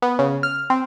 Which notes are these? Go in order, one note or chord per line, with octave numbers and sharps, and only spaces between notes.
B3
C#3
F6
C4